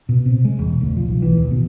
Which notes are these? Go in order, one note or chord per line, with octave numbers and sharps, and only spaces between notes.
B2
C3
G#3
E1
D2
F3
B1
E3
D#2
B2